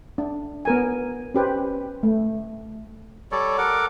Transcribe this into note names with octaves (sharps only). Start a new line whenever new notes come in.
D4
B3 A#4 G#5
C#4 G4 B4 C5
A3
G3 A4 C#5 D5
A4 A#4 F#5 D6